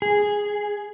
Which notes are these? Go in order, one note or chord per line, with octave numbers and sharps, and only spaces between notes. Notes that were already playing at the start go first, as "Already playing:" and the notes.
G#4